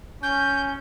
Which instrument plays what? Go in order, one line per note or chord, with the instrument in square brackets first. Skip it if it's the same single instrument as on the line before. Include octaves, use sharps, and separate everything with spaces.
[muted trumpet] C#4 [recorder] G6